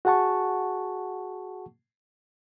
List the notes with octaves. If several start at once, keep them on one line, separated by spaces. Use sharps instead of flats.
F#4 G#4 F#5 A5 C#6